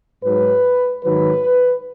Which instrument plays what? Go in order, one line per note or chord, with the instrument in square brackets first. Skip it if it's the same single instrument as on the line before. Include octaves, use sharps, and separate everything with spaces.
[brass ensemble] G#2 F#3 B4
G#2 D#3 F#3 B4